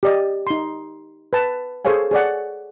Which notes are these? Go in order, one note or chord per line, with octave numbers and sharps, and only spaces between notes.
G4 D5 D#5
D#4 C6
B4 A5
G#4 A4 C5 C#5 F5 G#5
G#4 C#5 D5 F#5